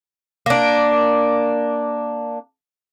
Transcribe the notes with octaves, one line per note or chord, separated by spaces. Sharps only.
A#3 D4